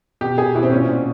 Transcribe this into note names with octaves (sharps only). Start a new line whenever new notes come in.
B2 G4
B2 G#4
B2 E4
C4
A#2 C#4
A#2